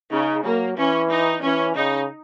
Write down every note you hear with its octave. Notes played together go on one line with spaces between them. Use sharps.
C#3 D#4
F#3 A#3
E3 C#4
D#4
E3 C#4
C#3 D#4